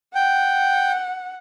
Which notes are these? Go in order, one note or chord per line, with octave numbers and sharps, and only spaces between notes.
F#5 G5